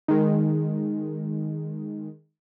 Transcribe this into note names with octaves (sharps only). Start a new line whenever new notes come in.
D#3 G#3